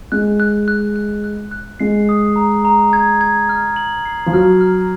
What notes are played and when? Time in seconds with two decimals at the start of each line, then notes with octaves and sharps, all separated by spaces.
0.12 G#3 F#6
0.40 F#6
0.68 F#6
0.96 F#6
1.24 F#6
1.51 F#6
1.80 G#3 C7
2.09 D#6
2.36 A#5
2.65 A#5
2.93 G#6
3.21 G#6
3.49 F6
3.76 F#7
4.05 C7
4.26 F3
4.33 F#3 F6
4.61 F6